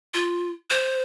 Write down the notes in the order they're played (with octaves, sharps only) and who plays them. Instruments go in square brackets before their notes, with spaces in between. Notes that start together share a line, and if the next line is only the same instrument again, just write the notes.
[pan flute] F4
C5